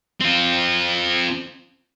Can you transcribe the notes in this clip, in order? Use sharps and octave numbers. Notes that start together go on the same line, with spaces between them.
C4 F4